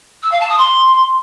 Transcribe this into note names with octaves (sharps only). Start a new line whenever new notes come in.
E6
F5
A5
D#6
C6